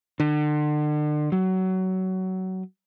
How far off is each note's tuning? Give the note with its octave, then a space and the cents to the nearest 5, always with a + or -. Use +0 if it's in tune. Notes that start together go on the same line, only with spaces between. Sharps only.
D3 +35
F#3 +20